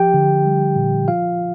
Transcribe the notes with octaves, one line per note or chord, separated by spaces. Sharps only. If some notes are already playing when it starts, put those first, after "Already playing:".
Already playing: F3 G4 G5
D3
G3
A#2
F3 F4 F5